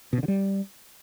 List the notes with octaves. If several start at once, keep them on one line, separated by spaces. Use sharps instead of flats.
B2
C#3
D3
G3